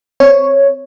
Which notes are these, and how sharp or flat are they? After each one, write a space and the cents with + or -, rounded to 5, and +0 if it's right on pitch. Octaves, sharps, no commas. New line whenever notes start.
C4 +0 C#5 +0